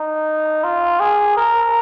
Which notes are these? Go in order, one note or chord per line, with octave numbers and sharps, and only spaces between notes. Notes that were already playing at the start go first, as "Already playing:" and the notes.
Already playing: D#4
F4
G#4
A#4